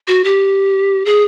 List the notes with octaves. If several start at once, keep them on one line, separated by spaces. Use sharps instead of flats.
F#4
G4
G#4